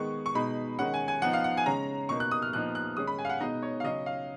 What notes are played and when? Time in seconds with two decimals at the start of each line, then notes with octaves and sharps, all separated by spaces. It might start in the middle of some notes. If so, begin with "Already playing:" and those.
Already playing: D#3 G#3 B3 C#6
0.26 C#6
0.35 B2 G#3 D#4 B5
0.79 D#3 G#3 C#4 F#5
0.94 G#5
1.08 G#5
1.22 F3 B3 D#4 F#5
1.33 F5
1.44 F#5
1.57 G#5
1.66 C#3 G#3 C#4 A#5
2.09 B2 A#3 D#4 C#6
2.20 F#6
2.31 D#6
2.42 F6
2.53 A#2 F3 B3 D#4 F#6
2.75 F#6
2.97 D#3 G#3 C#4 D#6
3.07 B5
3.19 G#5
3.25 F5
3.29 F#5
3.40 B2 G#3 B3 D#4 D#5
3.63 C#5
3.80 F5
3.84 C#3 F#3 C#4 D#5
4.06 F5